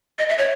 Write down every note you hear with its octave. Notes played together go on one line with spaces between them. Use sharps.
D#5
E5
C#5